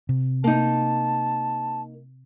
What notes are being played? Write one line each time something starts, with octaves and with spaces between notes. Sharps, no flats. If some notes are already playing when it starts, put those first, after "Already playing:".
C3
A#3 D#4 A5